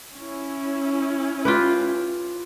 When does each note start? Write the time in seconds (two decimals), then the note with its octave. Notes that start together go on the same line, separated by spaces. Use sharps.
0.17 C#4 E4
1.45 F4 G4 B4